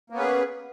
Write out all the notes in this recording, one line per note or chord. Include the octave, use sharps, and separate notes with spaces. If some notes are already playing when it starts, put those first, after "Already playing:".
A#3 B3 C#4 G#4 B4